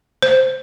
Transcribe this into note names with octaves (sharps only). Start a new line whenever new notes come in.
C5